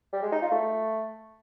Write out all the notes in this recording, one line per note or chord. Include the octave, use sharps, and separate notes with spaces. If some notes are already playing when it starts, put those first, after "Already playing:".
G3
G#3
D#4
F4
A3